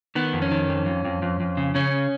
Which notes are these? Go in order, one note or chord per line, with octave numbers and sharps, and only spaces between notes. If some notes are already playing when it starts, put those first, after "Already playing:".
D#3 B3
F2
C#4
D#3
F2
F2
F2
F2
F2
C#3
C#3 C#4